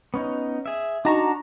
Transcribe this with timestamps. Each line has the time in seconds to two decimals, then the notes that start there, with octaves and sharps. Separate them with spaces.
0.14 B3 C#4 D#4
0.66 G#4 E5
1.05 D4 D#4 F#4 A5 A#5 C#6